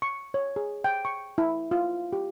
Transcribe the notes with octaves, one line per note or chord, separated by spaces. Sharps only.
C#6
C#5
G#4
G5
C#6
E4
F4
G4